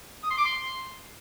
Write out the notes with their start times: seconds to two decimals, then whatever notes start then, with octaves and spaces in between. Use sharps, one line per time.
0.23 D#6
0.30 C6
0.38 D6
0.45 C6